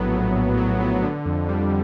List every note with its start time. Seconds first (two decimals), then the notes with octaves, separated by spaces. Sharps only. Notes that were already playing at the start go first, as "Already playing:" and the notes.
Already playing: A#1 A2 F#3 B3
0.12 A2
0.35 A#1
0.57 F#3
0.80 B3
1.03 D3
1.26 F2
1.49 G3